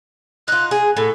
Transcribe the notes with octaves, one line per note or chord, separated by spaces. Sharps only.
D#4 F4 F#6
G#4 G#5
A2 A4